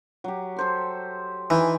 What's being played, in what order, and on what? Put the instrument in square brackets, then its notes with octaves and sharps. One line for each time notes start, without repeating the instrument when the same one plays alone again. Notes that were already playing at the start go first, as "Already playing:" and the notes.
[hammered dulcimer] F#3 G4
A4 C5 C6
[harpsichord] E3 [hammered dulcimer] D#4 G5 G#5